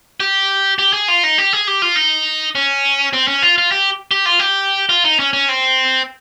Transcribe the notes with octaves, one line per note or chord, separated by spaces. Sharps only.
G4
G4
G#4
F4
D#4
G4
G#4
G4
F4
D#4
C#4
C4
C#4
F4
F4
G4
G4
F4
G4
F4
D#4
C#4
C#4
C4